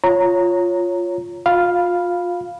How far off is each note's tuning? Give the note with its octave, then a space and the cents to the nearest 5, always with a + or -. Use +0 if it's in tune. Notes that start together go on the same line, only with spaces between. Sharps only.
F4 +0 C#5 +0 A#5 -10
F4 +30 F5 +0 B5 -5